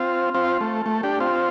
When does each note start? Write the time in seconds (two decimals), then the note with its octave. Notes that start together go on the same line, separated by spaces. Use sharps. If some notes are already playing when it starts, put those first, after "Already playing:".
Already playing: C4 F4
0.34 C4 F4
0.61 A3
0.86 A3
1.03 D4 G4
1.20 C4 F4